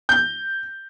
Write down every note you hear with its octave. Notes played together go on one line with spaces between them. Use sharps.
G6